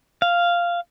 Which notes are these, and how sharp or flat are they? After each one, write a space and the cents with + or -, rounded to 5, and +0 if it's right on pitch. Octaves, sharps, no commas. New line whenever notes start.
F5 -5